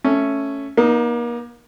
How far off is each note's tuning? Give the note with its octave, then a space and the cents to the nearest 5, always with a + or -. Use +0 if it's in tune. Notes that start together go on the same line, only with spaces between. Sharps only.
A3 +0 C#4 +0
A#3 +35 D#4 +0